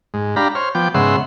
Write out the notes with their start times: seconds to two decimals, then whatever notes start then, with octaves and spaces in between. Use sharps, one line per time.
0.14 G#2
0.36 D4 G4 F5 A#5 B5
0.55 C5 C#5 F6
0.75 F3 B3 G5 D6
0.94 G#2 C#3 B3 E5 F#5 C6